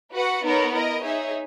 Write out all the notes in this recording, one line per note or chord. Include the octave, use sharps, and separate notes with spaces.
F#4 B4 F#5
B3 D#4 A#4 C#5
E4 A#4 D#5
D#4 G#4 C#5 E5